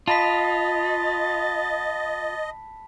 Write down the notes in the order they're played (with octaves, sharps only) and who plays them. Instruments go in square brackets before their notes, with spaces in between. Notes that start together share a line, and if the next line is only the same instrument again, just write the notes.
[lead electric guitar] F4 [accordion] D#5 [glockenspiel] A5 B5 B6 [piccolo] A6